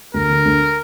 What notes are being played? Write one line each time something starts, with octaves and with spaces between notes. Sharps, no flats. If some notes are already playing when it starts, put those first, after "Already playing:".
D2 A#4
D3
D2